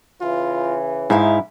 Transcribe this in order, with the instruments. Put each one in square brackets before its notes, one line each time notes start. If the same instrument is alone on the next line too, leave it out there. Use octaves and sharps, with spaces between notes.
[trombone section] C#3 E3 [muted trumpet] F4
[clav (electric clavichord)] G#2 [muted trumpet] D#4 [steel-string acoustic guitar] E4 E5 F5